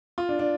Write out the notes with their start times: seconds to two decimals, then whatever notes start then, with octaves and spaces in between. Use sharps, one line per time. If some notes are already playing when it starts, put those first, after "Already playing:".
0.18 F4
0.29 D4
0.39 D4